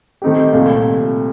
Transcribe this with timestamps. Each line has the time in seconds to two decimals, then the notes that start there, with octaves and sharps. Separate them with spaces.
0.22 D#3 A3 C4 D#4 G4
0.53 C2 A#2 A3